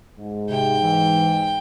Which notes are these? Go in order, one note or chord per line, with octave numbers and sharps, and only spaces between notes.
G#2
C3 G5
E3